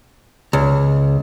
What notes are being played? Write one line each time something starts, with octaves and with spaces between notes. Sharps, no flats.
C#2